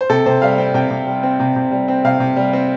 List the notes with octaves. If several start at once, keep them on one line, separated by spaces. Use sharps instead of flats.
C5
C3 A4
C3 C5
G3 F5
C4 G5
C3 G5
C3
G3
C4
C3
C3
G3
C4
C3 F5
C3
G3
C4